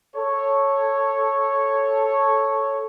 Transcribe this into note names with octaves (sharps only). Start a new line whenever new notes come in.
A4 C#5